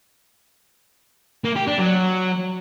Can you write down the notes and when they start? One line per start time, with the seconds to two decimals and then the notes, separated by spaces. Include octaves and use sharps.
1.45 A#3
1.56 G4
1.68 D4
1.79 F#3